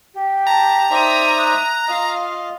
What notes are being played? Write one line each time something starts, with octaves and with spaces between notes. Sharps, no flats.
G4
A5 A#5
D#4 C5 D5 E5 D#6
F#6
F4 D#5 F5